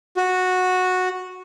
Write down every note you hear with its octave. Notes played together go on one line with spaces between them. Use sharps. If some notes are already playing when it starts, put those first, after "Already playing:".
F#4